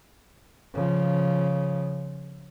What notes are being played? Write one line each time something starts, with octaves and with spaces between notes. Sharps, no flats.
C#3 F3